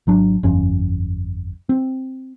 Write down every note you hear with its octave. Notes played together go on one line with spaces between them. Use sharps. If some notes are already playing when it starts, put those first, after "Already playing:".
G#1 F#3 D4
G1 F2 C#4
C4